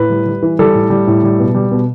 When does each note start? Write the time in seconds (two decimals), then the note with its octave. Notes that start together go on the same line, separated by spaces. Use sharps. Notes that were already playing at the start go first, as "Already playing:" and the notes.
Already playing: A2 B4
0.10 G3
0.26 G3
0.42 E3
0.59 G3 A4
0.74 A2
0.90 G3
1.07 A2
1.23 G3
1.39 B2
1.55 G3
1.71 B2